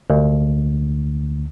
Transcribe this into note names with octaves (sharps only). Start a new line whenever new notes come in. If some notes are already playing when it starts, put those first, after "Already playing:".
D2